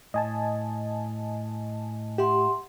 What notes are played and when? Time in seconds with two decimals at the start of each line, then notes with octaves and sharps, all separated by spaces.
0.14 A2 D#5 G#5 A5
2.18 G4 E5 F#5 C6